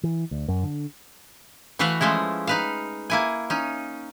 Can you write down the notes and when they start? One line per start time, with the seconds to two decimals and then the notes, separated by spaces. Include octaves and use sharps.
0.03 E3
0.31 D2
0.48 F#2
0.63 D3
1.79 E3 A3 F#4 B4 F5 F#5
2.01 F3 G#3 A3 C#4 E4
2.47 D#4 B4 F5
3.10 A#3 E4 G#5
3.50 C#4 D#4